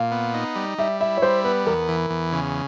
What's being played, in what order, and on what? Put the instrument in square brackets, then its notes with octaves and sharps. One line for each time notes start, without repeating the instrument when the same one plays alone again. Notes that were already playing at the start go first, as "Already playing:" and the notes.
Already playing: [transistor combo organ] A#2 [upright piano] F5
[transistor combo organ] B3
D#4
G3
[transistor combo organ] G3 [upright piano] E5
[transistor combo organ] E4 [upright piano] E5
[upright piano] C#5
[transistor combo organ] G3 [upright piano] C5
[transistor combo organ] B3 [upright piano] B4
[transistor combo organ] E2 [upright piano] A#4
[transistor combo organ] E3
E2
C#3